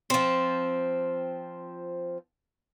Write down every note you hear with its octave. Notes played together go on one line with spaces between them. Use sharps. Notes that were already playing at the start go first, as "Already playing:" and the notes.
F3 C4